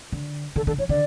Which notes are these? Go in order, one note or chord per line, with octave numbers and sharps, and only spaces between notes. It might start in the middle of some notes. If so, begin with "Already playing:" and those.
D3
D3 A4
D3 A4
E3 C#5
D3 D5